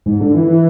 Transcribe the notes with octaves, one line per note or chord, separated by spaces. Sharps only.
G#2
D3
E3
E3